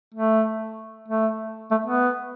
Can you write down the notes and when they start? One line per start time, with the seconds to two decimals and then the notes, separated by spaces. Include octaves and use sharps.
0.14 A3
1.08 A3
1.71 A3
1.86 B3